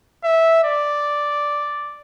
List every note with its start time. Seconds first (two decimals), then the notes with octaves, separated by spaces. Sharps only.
0.24 E5
0.64 D5